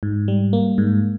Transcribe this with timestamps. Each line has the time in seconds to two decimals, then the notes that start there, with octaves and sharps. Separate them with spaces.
0.03 G#2
0.28 G3
0.53 A#3
0.78 G#2